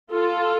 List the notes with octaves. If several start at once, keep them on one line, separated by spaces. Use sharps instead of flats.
F4 A4